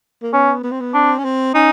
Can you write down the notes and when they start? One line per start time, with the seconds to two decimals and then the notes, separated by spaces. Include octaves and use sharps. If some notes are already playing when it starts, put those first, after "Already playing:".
0.22 A#3
0.33 B3 C#4
0.63 B3
0.72 C4
0.81 B3
0.94 C4 D4
1.18 C#4
1.24 C4
1.54 C#4 D#4